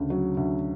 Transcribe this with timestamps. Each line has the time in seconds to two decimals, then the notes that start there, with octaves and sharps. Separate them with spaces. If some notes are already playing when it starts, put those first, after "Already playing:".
Already playing: D2 C#3
0.10 F#3
0.37 D2